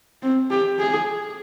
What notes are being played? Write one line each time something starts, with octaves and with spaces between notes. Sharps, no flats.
C4
G4
G#4